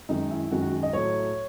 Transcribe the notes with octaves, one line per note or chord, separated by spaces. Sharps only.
F#2 D#3 G#3 D#4
E4
F#2 D#3 G#3 F#4
F#4
D#5
A2 F#3 A3 C#5